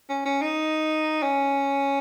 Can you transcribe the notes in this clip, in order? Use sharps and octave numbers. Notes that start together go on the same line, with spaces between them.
C#4
C#4
D#4
C#4